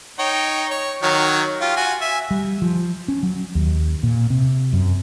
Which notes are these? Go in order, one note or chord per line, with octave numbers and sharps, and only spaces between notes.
D#4 C#5 G5
C#5
D#3 F#3 C#5
F4 G4
F4 F#4 G#5
E5 G#5
G3
F3
C#4
F#3
D#2
A#2
C3
F#2